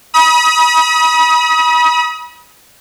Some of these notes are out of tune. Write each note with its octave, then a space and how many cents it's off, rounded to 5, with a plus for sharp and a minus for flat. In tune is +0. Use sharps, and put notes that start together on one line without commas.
B5 -35 D#6 +30